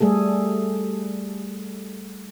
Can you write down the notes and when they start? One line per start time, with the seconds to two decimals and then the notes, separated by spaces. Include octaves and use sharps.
0.01 G3 A3 G#4 A4